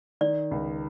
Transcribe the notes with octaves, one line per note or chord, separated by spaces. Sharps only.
D#3 D5
C#2